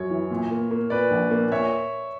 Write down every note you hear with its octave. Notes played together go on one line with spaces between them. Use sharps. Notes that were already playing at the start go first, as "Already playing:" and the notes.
Already playing: F#2 C#5
E3
A#2
A#3
A#3
A#2 B4 D5
A#1
A#3
A#2 C#5 E5